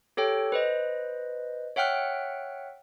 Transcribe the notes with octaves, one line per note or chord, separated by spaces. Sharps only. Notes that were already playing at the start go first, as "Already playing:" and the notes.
G4 A4 C#5 G5
B4 C5 D#5
C#5 E5 F#5 G5 F6 F#6